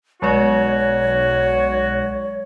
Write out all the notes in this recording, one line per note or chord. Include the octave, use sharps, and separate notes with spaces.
B1 F#3 G#3 F#4 C#5 D5